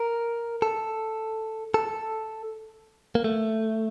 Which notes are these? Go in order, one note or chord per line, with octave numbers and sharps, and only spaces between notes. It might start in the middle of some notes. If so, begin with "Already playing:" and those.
Already playing: A#4
A4
A4
A#3
A3